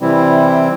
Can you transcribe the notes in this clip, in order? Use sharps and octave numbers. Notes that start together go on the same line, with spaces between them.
C3 E3 G3 C4 E4